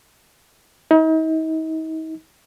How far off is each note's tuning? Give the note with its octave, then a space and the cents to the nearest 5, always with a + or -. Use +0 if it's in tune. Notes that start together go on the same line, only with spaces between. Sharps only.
D#4 +40